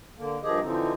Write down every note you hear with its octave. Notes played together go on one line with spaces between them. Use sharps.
D3 A#3
G2 D#3 F3 G4 G#4 D#5
D3 E3 F3 C4 D#4